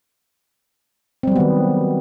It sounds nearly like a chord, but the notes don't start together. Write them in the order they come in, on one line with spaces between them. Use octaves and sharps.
C4 G3 F#3 B3 D#3